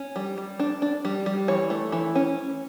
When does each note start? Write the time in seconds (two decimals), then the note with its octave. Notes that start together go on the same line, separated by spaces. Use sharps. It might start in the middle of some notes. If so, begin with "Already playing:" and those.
Already playing: C#4
0.16 G3
0.38 G3
0.59 D4
0.82 D4
1.05 G3
1.26 G3
1.48 E3 C#5
1.70 A3
1.92 E3
2.15 C#4